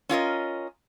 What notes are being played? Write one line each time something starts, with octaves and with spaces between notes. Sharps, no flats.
C#4 F4 A#4 D#5